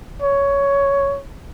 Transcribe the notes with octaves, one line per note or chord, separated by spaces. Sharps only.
C#5